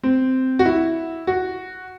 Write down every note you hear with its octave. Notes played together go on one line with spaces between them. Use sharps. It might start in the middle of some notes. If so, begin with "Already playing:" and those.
C4
F#4
E4
F#4